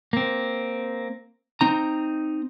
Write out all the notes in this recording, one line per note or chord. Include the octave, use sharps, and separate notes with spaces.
A#3 C4
C4 D#4 A#5